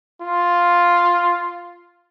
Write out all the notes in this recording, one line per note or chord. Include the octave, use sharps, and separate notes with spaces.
F4